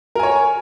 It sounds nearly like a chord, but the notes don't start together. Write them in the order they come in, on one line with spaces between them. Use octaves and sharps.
A#4 G#5 C#5